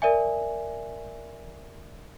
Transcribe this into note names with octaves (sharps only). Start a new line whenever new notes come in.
A#4 D5 E5 G#5